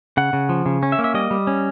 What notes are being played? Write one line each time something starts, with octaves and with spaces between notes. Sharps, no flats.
C#3 F#5
C#3
F3
C#3
C#4
E5
A#3
E5
G3 D#5
G3
C#4